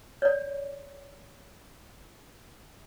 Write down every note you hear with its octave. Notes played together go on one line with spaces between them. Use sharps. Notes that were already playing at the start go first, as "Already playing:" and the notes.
C#5 D5